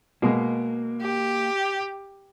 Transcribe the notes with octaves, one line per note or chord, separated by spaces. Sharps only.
B2 G#3 A#3
G4